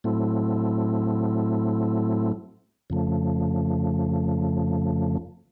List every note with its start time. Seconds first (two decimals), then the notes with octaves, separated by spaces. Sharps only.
0.04 A2 F#3 A3 C4 E4
2.90 F2 C#3 F3 A3